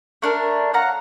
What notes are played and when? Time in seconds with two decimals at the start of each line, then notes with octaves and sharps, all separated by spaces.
0.22 A3 D4 A#4
0.73 C#5 F5 F#5 A#5